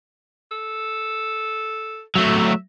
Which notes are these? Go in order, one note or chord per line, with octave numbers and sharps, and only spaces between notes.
A4
F#3 A3 E5